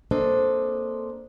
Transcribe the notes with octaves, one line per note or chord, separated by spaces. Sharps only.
A#3 C4 D4 A4 C5 D#5